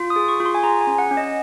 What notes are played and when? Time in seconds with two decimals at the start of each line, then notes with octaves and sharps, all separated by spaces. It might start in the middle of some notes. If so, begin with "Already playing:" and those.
Already playing: F4
0.10 D#6
0.16 G#4
0.28 C#6
0.40 F4
0.46 C6
0.55 G#5
0.63 G#4 A#5
0.81 G#5
0.87 C#4
0.98 F#5
1.11 C#4
1.17 D#5